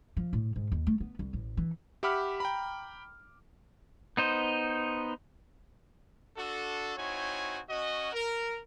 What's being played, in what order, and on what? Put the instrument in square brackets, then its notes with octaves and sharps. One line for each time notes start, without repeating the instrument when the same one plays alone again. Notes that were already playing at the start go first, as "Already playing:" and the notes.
[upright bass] F3
A2
G#2
D#2
A3
B3
C2
A1
E3
[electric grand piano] G4 E5 F#5 B5 D6 F6
G5 A#5 B5
[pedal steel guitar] B3 D#4 C5
[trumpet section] D4 F#4 A4
C4 D#4 E4 F#4 C#5 G#5
C#4 F#4 D#5
A#4